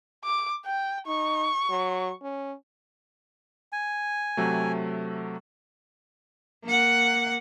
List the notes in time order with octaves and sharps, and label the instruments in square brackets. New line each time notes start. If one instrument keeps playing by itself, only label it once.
[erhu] D6
G5
[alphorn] D#4 [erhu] C#6
[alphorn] F#3
C#4
[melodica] G#5
[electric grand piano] C3 F#3 A3
[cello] A#3 F#5